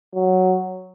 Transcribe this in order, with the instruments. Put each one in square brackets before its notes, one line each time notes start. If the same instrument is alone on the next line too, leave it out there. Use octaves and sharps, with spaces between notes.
[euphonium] F#3